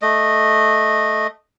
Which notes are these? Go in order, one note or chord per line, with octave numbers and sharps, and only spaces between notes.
A3 D#5